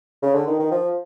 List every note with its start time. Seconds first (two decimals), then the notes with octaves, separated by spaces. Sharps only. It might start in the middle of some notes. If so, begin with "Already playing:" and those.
0.22 C#3
0.34 D3
0.47 D#3
0.59 D#3
0.71 F3